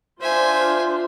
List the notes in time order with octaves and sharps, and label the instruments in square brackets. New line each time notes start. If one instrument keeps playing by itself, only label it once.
[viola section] D4 F4 C5 [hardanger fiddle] E5 G#5